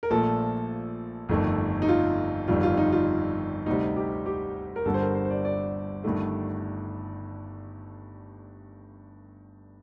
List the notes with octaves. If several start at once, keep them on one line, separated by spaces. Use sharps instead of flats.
A#4
A#1 A#2 F3 A3 A4
G1 F2 D#3 A3
D#4
F4
G1 F2 D#3 G3 F4
F4
D#4
F4
D2 C3 G3 D#4
G4
G4
A#4
G1 G2 D3 G3 A4
C5
A#4
C5
C5
D5
D5
G1 G2 D#3 A3